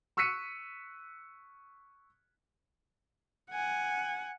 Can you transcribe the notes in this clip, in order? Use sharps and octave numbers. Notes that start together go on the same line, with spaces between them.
C#6 E6 F#6 B6 C#7 D#7
F#5 G#5